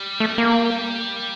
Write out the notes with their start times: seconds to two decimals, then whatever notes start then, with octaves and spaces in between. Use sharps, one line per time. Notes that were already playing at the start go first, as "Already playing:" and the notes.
Already playing: G3
0.20 A3
0.38 A#3